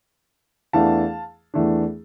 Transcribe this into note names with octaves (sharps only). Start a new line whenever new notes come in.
E2 E3 A3 D4 F5 A5
E2 E3 A3 D4